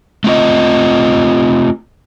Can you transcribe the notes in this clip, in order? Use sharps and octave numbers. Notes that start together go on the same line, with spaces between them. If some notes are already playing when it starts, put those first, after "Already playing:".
A3 C4 F4 D#5